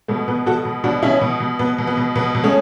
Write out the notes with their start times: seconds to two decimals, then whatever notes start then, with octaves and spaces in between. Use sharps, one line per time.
0.08 B2 A3
0.28 B2 B3
0.46 B2 F#4 A4
0.65 B2
0.84 B2 D4 F#4
1.02 B2 C#4 E4
1.21 B2
1.40 B2
1.59 B2 B3
1.78 B2
1.87 B3
1.97 B2
2.16 B2 B3
2.35 B2
2.44 A3 C#4